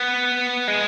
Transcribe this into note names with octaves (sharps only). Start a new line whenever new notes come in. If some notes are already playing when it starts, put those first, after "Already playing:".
Already playing: B3
G#3